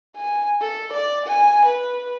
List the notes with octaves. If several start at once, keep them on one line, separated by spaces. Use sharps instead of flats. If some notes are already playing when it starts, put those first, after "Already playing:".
G#5
A4
D5
G#5
B4